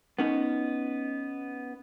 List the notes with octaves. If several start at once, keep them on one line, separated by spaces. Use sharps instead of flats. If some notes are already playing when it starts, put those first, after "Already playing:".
B3 C#4 D#4